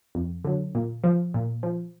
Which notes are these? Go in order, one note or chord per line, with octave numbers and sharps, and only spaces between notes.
F2
D3 F#3
A#2
F3
A#2
F3